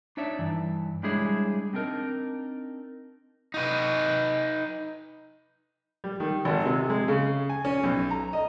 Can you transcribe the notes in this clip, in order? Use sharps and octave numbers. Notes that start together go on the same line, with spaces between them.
D4 D#4 C#5 D5 E5
G2 E3
G3 G#3 D4 E4 G#4 C#5
C4 D4 D#4 A#4
D#4 B4
G3
D#3
G#1
C3
G#3
C#3
G#5
C#4
B1
A#5
D#5